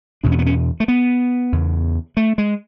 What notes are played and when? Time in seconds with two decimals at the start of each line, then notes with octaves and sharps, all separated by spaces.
0.23 E2 B2 D4
0.32 C#4
0.39 B3
0.46 C#4
0.80 A3
0.88 B3
1.52 E2 C#3
2.17 A3
2.38 G#3